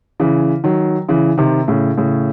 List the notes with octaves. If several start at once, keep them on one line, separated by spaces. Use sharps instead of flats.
C#3 E3
D#3 F#3
C#3 E3
C3 D#3
A2 C#3
A2 C#3